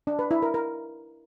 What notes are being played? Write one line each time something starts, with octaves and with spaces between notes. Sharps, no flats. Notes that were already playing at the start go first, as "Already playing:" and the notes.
D4
B4
E4
A#4
A#4